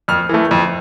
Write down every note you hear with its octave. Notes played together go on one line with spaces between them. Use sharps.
F2 F6
E3 A3
F2